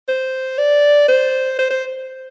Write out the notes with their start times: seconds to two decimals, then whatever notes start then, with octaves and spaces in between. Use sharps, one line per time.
0.09 C5
0.58 D5
1.08 C5
1.59 C5
1.71 C5